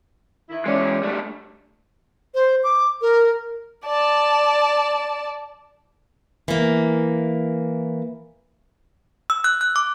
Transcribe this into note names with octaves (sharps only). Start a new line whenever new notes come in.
D#3 E4
E3 G#3 C#4 D5
G3 A3 D4
C5
D6
A#4
D5 A5
E3 A#3
E6
F#6
F#6
D6